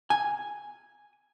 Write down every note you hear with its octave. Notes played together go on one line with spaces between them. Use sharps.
G#5